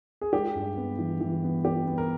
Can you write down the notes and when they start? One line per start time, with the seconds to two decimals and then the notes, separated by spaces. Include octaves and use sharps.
0.21 G#4
0.33 G#3 G4
0.55 G2
0.77 B3
0.99 E3
1.21 E3
1.43 B3
1.65 B3 G4
1.87 B3
1.98 A#4